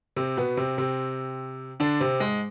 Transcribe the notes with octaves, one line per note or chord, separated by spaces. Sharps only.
C3 C4
B2 B3
C3 C4
C3 C4
D3 D4
C3 C4
G#2 G#3